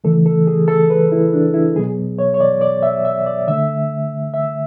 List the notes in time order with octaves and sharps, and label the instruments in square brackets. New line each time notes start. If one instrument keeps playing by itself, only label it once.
[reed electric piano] C#3 E3 A3 A4
A4
G#4
A4
B4
E4
D4
E4
B2 F#3 B3 G#4
C#5
C#5
D5
D5
E5
E5
D5
D3 A3 E5
E5